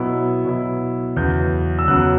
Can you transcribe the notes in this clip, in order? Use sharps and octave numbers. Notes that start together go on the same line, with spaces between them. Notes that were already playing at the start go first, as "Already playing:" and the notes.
Already playing: B2 F#3 B3 E4
B2 F#3 B3 E4
E2 C#3 F#3 G6
E6
E2 C#3 F#3 F#6